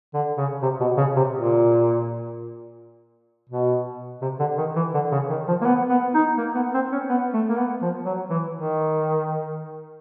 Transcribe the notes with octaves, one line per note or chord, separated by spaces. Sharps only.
D3
C#3
C3
B2
C#3
C3
A#2
B2
C3
D3
D#3
E3
D3
C#3
D#3
F3
A#3
B3
B3
D#4
A#3
B3
C4
C#4
B3
A3
A#3
B3
F3
F#3
E3
D#3